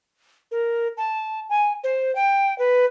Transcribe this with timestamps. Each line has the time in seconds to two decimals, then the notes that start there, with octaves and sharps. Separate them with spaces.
0.52 A#4
0.97 A5
1.49 G#5
1.84 C5
2.15 G5
2.59 B4